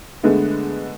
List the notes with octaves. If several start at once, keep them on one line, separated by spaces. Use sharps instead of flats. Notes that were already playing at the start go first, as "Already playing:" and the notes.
D3 G#3 A3 B3